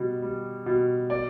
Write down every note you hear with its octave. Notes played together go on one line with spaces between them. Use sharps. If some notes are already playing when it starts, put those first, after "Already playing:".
Already playing: B2 G3
G3
B2
D5